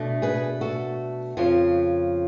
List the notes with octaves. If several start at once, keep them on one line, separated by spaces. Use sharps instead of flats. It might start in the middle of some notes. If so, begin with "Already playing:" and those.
Already playing: B2 A3 D4
G#4 B4
F#4 A4
F2 C#3 F3